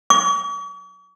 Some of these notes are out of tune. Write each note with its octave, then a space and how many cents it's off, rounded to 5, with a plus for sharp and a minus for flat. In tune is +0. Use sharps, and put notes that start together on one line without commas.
C#6 +45